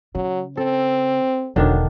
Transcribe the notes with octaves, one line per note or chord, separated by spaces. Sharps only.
C#3 F#3
C4 A4
E1 D3 D#3 F#3 D4